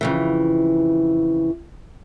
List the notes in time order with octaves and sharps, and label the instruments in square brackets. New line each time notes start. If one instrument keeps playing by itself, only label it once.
[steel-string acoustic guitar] F2 C#3 E3